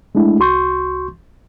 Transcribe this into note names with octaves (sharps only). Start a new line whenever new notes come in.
G#3 A3 D4 E4
C2 F#4 C6 C#6 G6